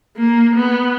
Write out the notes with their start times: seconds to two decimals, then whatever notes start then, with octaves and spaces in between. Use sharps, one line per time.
0.16 A#3
0.56 B3